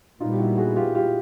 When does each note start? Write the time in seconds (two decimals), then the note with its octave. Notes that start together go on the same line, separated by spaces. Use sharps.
0.20 A#2 G3 B3 D#4 F4
0.32 G4
0.39 E4 F#4
0.58 F#4 G#4
0.76 F4 G4
0.95 F4 G4